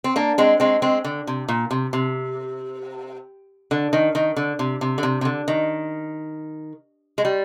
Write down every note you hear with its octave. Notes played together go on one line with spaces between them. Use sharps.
C4
A#3 D4
G#3 C4
G#3 C4
G#3 C4
D3
C3
A#2
C3
C3
D3
D#3
D#3
D3
C3
C3
D3
C3
C3
D3
D#3
G#3
G3